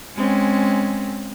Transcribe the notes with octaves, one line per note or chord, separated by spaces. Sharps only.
G#3 C4 C#4